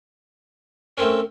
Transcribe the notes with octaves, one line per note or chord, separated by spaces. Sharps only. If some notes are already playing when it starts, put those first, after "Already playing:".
A3 C4 C#4 A#4